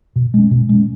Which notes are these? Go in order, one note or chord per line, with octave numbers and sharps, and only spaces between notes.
B2
G#3 C#4
B2
G#3 C#4